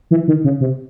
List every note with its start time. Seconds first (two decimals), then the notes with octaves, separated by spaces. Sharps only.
0.11 E3
0.28 D#3
0.44 C#3
0.60 C3